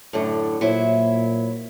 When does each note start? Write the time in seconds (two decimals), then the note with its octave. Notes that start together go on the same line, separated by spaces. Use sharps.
0.13 F#2 A2 D3
0.61 A#2 F#3 E4 C5